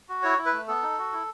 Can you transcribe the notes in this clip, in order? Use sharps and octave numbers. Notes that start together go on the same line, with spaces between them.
F#4
E4 C#5
E4
B4
A3
B3 A4
D#4
F#4
E4